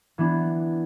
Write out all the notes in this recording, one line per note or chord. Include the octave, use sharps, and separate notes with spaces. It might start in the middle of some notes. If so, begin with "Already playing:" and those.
E3 B3 D4